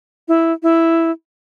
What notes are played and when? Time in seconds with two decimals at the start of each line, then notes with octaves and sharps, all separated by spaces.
0.28 E4
0.63 E4